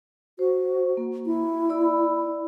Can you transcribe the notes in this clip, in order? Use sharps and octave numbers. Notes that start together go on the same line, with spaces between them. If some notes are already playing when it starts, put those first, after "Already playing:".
F#4 C5
A#3
E4
D5 B5 E6